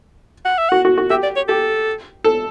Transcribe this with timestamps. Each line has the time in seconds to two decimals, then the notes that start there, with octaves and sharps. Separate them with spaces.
0.45 F#5
0.58 E5
0.69 F#4 F#5
0.85 F#4
0.98 F#4
1.10 G4 E5
1.23 D5
1.36 C#5
1.48 G4 A4
2.24 A4